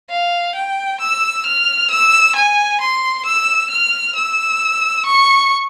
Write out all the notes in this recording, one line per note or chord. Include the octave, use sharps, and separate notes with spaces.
F5
G5
E6
F6
E6
G#5
C6
E6
F6
E6
C#6